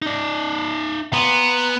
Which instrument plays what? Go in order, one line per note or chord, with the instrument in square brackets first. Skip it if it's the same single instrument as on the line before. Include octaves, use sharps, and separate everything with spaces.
[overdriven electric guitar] D#4 D5
[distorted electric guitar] B3 [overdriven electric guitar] A#5 C6